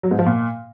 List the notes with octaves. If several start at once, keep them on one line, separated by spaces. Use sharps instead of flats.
F#3
G#2
F3
A#2